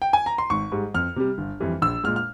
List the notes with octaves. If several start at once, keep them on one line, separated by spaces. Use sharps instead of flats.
G5
G#5
A#5
C6
G#1 C#6
G#2 G3
F2 F6
C3 G3
G1
F2 E3 G3
A#1 E6
A#2 G#3 F6
F6